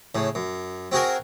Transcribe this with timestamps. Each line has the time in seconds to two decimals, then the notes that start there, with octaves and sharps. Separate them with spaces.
0.15 A2 C#3
0.35 F#2
0.92 C4 F#4 G#4 A#4